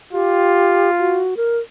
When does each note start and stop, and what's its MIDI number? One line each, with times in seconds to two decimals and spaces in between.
0.13 1.25 65
0.13 0.90 67
0.99 1.34 66
1.37 1.58 70